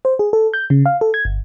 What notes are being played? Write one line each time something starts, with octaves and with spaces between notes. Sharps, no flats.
C5
G#4
A4
G6
C#3
F5
A4
G#6
G1